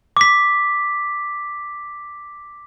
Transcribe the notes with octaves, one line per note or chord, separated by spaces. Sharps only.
D6 B6